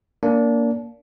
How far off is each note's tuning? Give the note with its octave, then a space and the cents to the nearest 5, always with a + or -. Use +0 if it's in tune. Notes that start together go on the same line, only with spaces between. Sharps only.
A#3 +0 D4 -25